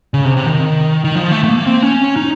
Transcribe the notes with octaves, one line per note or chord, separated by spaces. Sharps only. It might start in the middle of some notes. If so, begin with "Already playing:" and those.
C#3
C3
C3
D#3
D#3
F3
A3
A3
A#3
C4
C#4
D#4